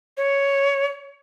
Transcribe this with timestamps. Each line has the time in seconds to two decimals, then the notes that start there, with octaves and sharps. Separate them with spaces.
0.17 C#5